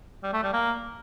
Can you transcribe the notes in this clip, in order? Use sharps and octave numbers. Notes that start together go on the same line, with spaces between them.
G3
A3
G3
A#3